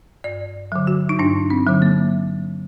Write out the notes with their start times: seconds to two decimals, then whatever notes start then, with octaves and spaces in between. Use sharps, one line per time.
0.24 G2 D5
0.72 D3 F#3
0.87 F#4
1.09 D#4
1.19 G2 D4
1.50 C4
1.67 D3 F#3
1.82 A#3